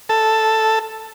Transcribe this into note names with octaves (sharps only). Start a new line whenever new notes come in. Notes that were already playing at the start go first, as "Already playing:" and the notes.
A4